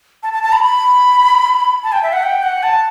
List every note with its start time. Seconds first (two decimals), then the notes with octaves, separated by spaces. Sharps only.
0.23 A5
0.33 A5
0.43 A5
0.53 B5
0.63 B5
1.84 A5
1.93 G5
2.03 E5
2.13 F#5
2.23 G5
2.43 F#5
2.63 A5